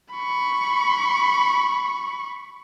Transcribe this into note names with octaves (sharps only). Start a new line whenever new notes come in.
B5 C#6